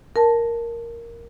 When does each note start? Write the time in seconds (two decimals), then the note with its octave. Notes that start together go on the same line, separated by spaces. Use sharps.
0.16 A#4 A5